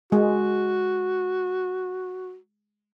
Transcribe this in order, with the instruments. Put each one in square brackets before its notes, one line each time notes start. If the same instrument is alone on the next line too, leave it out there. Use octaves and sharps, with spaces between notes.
[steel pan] G#3 [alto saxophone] F#4